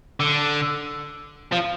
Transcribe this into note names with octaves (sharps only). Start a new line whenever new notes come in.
D3
F3